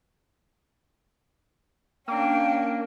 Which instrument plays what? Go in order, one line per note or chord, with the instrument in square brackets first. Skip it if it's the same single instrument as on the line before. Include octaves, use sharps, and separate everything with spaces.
[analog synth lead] A#3 [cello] C#4 D4 [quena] G5